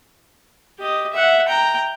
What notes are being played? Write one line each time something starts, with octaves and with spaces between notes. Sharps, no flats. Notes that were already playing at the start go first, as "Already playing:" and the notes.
G4 D#5
E5 F#5
G5 A#5